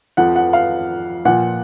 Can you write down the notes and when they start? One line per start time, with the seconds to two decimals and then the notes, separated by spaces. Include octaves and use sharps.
0.17 F2 F3 F#5
0.36 F#5
0.53 F5
1.25 A#2 F3 F#5